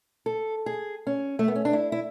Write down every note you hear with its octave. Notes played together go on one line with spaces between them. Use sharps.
A4
G#4
C#4
A3
B3
C#4
D4
E4
E4